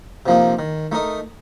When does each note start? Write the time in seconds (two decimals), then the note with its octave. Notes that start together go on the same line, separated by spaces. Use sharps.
0.26 C3 F3 A#3 D#4
0.59 D#3
0.92 A3 D#4 A#4 D#5